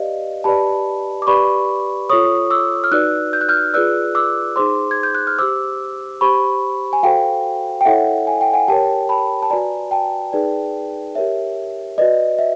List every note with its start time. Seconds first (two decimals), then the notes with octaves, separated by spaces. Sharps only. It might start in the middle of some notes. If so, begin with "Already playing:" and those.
Already playing: G4 B4 D5 D#5 F5
0.44 G4 B4 D5 A5 B5
1.22 D6
1.27 G4 B4 D5 B5 C#6
2.09 F4 A4 C#5 C#6 D#6
2.50 D6 E6
2.84 F6
2.91 D#4 F#4 B4 D5 E6 F#6
3.33 G6
3.41 F#6
3.49 F6 G6
3.74 F4 G#4 B4 D5 E6 F#6
4.15 D6 E6
4.56 D#4 G#4 C5 C6 D6
4.91 G#6
5.03 G6
5.15 F#6
5.27 F6
5.39 G4 C5 D6 E6
6.21 G4 C5 B5 C#6
6.93 G#5
7.03 F#4 A4 C5 F5 G5
7.81 G5
7.85 E4 A4 C#5 E5 F#5
8.27 G#5
8.41 G5
8.53 F#5 G#5
8.68 G4 A#4 C#5 G5 A5
9.09 A5 B5
9.43 A5
9.50 F#4 B4 D5 G#5 A#5
9.91 G5 A5
10.33 D#4 G#4 B4 D5
11.15 G4 A#4 C#5 E5
11.98 F#4 B4 D5 D#5
12.39 E5